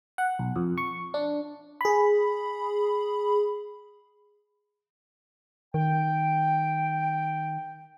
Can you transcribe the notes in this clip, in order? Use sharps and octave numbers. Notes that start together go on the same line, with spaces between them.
F#5
B1
F2
C#6
D4
G#4 B5
D#3 G5